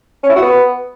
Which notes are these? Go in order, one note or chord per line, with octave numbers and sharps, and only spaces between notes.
C#4
E4
F#4
B3